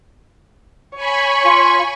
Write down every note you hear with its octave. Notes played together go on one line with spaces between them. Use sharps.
C#5 G#5 B5 C#6
F4